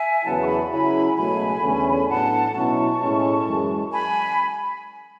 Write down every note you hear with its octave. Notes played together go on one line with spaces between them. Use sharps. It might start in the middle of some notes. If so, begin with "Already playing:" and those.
Already playing: E5 G#5
E2 C#3 F#3 B3 E4 F#5 A5
C#6
G#5 B5
C#3 F#3 C#4 E4 G#5 B5
C#2 B2 F#3 A3 G#5 B5
E2 D3 A3 C#4
A2 F#3 B3 D4 F#5 A5
B2 F#3 C#4 E4 A5 C#6
A2 G#3 C#4 E4
F#2 E3 G#3
G#5 B5